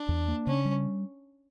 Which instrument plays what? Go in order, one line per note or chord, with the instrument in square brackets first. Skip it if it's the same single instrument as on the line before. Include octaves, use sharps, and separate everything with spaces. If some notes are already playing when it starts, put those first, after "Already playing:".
Already playing: [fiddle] D4
[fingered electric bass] E2
A#3
[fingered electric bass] C#3 [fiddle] C#4
[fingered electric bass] G3